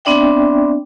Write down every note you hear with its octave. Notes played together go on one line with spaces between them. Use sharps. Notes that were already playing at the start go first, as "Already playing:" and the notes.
B3 C4 D4 D5 E5 G5